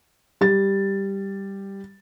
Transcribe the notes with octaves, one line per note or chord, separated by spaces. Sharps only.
G3 A6